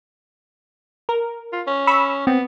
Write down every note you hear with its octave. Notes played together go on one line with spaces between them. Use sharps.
A#4
F4
C#4
B5 C#6 E6
B3 C4